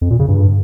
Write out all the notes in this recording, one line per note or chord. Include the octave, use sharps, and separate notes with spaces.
F2
A#2
C#3
G2